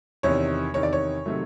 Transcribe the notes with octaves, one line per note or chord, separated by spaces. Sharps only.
E2 C3 D#3 C#5
E2 C3 D#3 C#5
D5
C#5
C3 D#3 F#3 A3